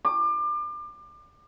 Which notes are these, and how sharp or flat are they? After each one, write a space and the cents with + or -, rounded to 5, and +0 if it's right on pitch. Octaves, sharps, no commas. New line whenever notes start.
D6 +30